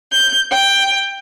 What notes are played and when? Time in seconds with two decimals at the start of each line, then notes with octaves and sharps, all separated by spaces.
0.10 G6
0.50 G5